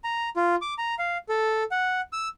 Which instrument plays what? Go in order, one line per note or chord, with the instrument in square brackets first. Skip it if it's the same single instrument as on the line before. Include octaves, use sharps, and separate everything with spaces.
[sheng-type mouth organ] A#5
F4
D6
A#5
F5
A4
F#5
E6